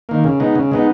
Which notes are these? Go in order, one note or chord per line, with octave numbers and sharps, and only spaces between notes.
D#3 A#3
C#3
G#3 B3 D#4
C#3
G#3 B3 D#4